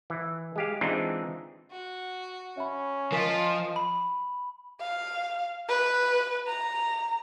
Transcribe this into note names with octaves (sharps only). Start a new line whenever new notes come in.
E3
G#3 G4 F5
E3 G#3 C4 D4 D#4 F4
F#4
C#4 E5 B5
F3 F4 A#4 D#5 G#5 B6
B5
F5
B4
A#5